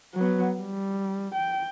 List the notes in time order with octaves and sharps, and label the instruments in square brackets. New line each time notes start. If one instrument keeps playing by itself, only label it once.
[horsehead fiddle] F#3 B3
G3
G5